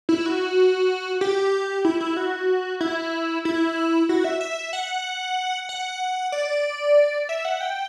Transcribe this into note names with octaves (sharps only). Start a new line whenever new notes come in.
E4
F#4
G4
E4
E4
F#4
E4
E4
F#4
E5
E5
F#5
F#5
D5
E5
F#5
G5